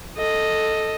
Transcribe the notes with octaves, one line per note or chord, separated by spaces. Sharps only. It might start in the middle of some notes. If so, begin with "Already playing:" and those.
A4 D#5